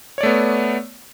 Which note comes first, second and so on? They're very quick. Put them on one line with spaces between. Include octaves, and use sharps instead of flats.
C#5 D5 A3 B3